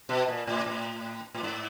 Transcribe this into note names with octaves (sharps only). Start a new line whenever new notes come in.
B2
A#2
A2
A2
A2
G#2